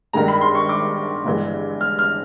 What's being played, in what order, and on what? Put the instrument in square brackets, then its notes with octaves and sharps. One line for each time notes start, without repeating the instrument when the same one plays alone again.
[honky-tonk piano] G2 D#3 G#3 [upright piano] A#5
[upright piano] B5
C6
C#6
D6
[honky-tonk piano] G1 G2 E3 G#3
[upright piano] F6
F6